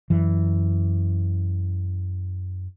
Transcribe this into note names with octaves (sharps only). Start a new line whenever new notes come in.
F#2 E3